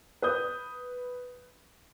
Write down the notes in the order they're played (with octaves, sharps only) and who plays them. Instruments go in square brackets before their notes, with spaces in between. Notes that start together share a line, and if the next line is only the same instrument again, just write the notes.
[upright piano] B4 D#6 G6